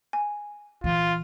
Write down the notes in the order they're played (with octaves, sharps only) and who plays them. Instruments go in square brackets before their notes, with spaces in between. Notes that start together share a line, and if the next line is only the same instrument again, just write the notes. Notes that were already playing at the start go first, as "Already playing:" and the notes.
[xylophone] G#5
[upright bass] A#2 E3 [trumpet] F4